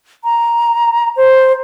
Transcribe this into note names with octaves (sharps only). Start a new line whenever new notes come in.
A#5
C5